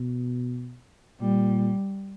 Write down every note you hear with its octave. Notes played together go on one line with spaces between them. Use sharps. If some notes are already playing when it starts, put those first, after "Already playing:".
Already playing: B2
A#2 G3